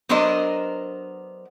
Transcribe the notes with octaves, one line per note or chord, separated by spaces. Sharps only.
F#3 B3 D4 A#4 C5 D#5